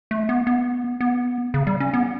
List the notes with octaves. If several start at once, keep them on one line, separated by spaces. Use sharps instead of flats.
A3
B3
B3
B3
C#3
G3
C#4
B3